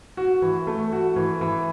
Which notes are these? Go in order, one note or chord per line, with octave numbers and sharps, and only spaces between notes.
F#4
E3
A3
F#4
E3
E3